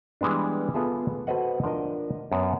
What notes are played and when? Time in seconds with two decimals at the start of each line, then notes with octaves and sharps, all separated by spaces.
0.21 E3 G3 G#3 B3 D4
0.74 B3 F4 G#4 A4 E5
1.27 F#4 A4 B4 C5 D#5 F#5
1.64 F3 D4 A#4 D#5
2.32 F#2 B3 C#5 A5